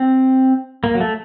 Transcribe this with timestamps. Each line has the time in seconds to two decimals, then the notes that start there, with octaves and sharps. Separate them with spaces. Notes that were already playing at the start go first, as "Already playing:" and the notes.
Already playing: C4
0.84 A#3
0.95 F#3
1.00 A3